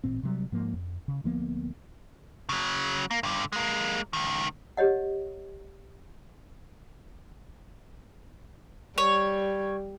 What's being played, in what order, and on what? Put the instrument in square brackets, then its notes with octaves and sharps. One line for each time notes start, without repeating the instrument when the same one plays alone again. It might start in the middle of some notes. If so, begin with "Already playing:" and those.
[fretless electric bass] A1 A#2 C4
C3 F#3 G3
G#2 F3 A#3
F2
C#3
D2 F3 A#3 B3
[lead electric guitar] C#3 F#3
A#3
G2 D3
G#3 A#3
C#2 D#3
[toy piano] G4 C#5 D#5 F#5
[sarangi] G3 [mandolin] C#5